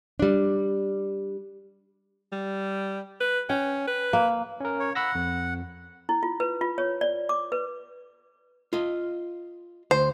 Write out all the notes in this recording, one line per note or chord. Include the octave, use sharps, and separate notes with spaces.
G3 D4
G3
B4
C#4 G5
B4
A#3
C#4 A#4
C#5
F#5 B5 E6 A#6
F2
E4
F4
B4
F4
C#5
D5
D6
B4
F4 D#5
D2 C5